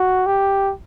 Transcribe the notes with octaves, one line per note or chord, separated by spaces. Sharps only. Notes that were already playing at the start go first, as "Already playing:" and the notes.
Already playing: F#4
G4